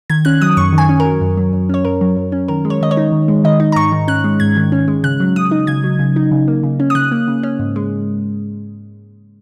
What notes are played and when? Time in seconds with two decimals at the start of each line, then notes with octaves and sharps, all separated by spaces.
0.10 D#3 G#6
0.25 C#4 F#6
0.41 F#3 D#6
0.57 F#2 C#6
0.73 D#3
0.78 G#5
0.89 C#4
1.00 A#4
1.05 F#3
1.21 F#2
1.37 F#3
1.53 F#2
1.69 C#4 C#5
1.85 F#2 A#4
2.01 F#3
2.17 F#2
2.32 C#4
2.48 D#3 A#4
2.65 G#3
2.70 C#5
2.81 D#3 D#5
2.91 C#5
2.97 D#4
3.12 D#3
3.28 G#3
3.44 D#3 D#5
3.60 D#4
3.72 A#5
3.76 G#2 C#6
3.92 D#3
4.08 C#4 F#6
4.24 G#3
4.40 G#2 G#6
4.57 D#3
4.72 C#4
4.88 G#3
5.03 C#3 F#6
5.20 F#3
5.36 C#3 D#6
5.51 D#4
5.67 C#3 G#6
5.84 F#3
5.99 C#3
6.16 D#4
6.31 C#3
6.48 A#3
6.63 C#3
6.80 C#4
6.90 D#6
6.95 C#3 F#6
7.12 A#3
7.28 C#3
7.43 C#4
7.59 G#2
7.76 G#3